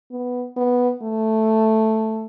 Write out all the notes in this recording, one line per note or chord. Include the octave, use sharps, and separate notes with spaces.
B3
B3
A3